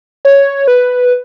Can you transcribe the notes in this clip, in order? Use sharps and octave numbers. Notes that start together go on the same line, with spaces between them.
C#5
B4